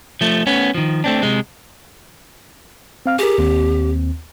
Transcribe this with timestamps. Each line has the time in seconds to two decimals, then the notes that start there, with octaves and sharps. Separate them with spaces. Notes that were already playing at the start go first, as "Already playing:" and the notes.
0.21 F3 A3
0.47 A3 B3 C#4
0.74 D#3 F3
1.04 A3 C4 D4
1.23 C3 G#3
3.06 C4 F5 F6
3.19 G4 G#4 A#4
3.38 D#2 C4